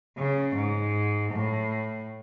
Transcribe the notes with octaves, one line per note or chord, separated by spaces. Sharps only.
C#3
G#2
A2